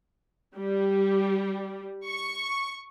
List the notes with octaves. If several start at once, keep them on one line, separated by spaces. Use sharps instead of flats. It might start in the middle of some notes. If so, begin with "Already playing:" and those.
G3
C#6